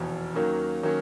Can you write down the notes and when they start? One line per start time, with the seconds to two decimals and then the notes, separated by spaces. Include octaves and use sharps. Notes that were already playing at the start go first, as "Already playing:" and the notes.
Already playing: F1 E2 B2
0.35 D#2 D#3 F#3 A#3 C#4
0.83 D#3 F#3 A#3 C#4